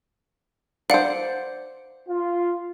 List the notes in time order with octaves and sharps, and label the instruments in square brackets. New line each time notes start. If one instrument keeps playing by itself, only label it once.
[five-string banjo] C5 D5 [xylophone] F5 F#5
[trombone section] F4